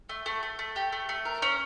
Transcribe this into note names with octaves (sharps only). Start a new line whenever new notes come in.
A3
A3
A3
A3
G4
A3
A3
A#4
C#4